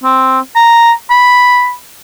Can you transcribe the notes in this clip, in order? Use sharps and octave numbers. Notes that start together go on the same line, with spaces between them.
C4
A#5
B5